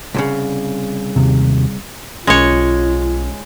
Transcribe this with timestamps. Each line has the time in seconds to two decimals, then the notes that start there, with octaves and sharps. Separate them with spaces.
0.15 C2 A#2 C#3
1.16 D#2 C3
2.27 B1 G#3 C#4 F4 C#5